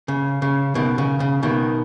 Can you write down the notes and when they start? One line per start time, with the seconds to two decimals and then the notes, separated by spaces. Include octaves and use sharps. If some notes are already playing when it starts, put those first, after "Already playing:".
0.08 C#3
0.42 C#3
0.75 B2 D#3
0.98 C#3
1.20 C#3
1.43 B2 D#3